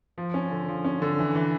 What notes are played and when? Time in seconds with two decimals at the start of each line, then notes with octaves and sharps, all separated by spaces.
0.18 F3
0.34 C#4
0.51 D3
0.68 F3
0.84 C#4
1.02 D3
1.19 E3
1.35 E3